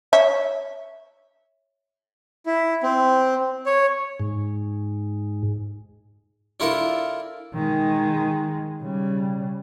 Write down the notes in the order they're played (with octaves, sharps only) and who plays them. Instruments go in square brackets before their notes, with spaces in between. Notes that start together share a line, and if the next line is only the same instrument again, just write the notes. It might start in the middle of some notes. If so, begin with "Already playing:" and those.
[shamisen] C#5 E5
[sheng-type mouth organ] E4
C4
C#5
[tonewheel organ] G#2
[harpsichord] D4 E4 F4 A4 A#4
[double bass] D#3 G#3
C#3 G3